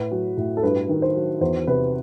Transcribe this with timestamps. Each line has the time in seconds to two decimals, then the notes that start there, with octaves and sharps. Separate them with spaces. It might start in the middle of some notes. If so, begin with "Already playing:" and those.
Already playing: A2 B4
0.11 F#3
0.37 A2
0.57 A4
0.63 G2 B4
0.89 D#3
1.02 C5
1.15 F#3
1.41 E2 C5
1.67 C3 B4